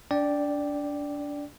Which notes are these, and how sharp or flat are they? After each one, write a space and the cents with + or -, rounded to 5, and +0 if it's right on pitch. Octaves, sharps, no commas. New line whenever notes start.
D4 -25 D5 +0 G5 +0